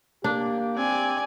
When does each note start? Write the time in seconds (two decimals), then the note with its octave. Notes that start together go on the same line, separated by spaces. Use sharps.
0.24 A#3 D4 G4
0.76 C4 D5 G#5